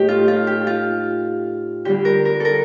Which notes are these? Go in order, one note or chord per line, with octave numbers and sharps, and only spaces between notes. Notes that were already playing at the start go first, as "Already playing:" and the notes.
Already playing: A2 A3 D#4 G4
F4
F4
G4
F4
D3 G3 D4 G4
A#4
A#4
A4 A#4